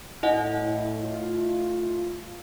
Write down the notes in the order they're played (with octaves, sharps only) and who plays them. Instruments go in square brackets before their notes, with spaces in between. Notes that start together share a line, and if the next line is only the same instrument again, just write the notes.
[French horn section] A2 [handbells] E4 D#5 F#5
[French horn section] A3 F4